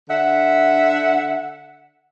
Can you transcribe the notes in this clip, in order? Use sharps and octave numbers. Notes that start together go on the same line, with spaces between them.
D3 E5 F#5